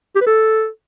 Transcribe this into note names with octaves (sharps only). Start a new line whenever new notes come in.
G4
B4
A4